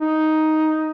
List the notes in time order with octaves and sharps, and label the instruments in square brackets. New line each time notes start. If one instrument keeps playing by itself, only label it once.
[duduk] D#4